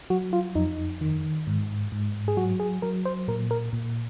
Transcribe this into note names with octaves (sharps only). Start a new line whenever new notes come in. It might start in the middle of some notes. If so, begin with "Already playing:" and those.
F#3 F#4
F4
F2 D#4
D#3
G#2
G#2
G#4
F#3 F#4
G#4
F#3 A#4
C5
A#2 A#4
A#4
A#2